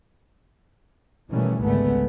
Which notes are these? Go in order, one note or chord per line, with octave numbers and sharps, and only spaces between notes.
B2 D#3 E3 G3 A3 C#4
G#1 C#2 D3 G#3 A3 B3